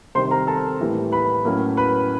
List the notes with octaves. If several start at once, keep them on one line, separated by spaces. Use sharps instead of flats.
C3 D#3 G3 C5 C6
A#4 A#5
A4 A5
A2 E3 G3 A#3
B4 B5
A2 F#3 A#3 C#4
B4 B5